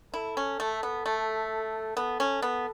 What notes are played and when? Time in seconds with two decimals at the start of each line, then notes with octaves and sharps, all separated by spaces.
0.14 E4 A4
0.37 C#4
0.60 A3
0.83 B3
1.06 A3
1.97 B3 A4
2.20 C#4
2.42 B3